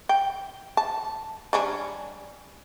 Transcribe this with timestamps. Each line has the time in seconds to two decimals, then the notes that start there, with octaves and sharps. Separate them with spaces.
0.09 G5
0.77 A5
1.53 G3 C#4 D4